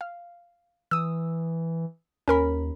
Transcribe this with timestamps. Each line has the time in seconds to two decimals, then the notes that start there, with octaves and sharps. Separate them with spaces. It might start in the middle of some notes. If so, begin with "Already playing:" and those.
0.01 F5
0.91 E3 D#6 E6
2.28 D#2 C#4 A#4 B5